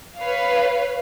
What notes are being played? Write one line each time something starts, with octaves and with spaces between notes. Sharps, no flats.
B4 C#5 F5